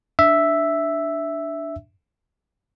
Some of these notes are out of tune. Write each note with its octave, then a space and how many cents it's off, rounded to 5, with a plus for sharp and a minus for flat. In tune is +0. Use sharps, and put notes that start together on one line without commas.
D4 +0 E5 +0